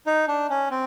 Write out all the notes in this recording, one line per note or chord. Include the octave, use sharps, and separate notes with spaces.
D#4
D4
C#4
C4